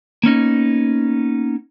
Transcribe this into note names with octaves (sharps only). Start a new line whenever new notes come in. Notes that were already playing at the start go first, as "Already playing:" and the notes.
A#3 B3 C#4 D#4